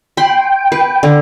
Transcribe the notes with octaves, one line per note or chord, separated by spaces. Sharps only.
G5 B5 C6
B4
D3